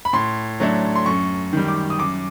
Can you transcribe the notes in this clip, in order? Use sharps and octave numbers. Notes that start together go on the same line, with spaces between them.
B5
A2 C6
F#3 A3 D4
C6
F#2 C#6
D#3 G3
D6
D#6
F#2 D6